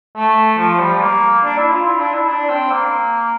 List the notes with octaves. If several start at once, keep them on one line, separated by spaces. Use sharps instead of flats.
A3
F3
G3
A#3
D4
E4
F4
E4
D4
E4
D4
C4
A#3